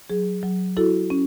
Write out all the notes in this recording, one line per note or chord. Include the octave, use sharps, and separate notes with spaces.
F#3 G#4
F#3
E4 F#4 A4
C#4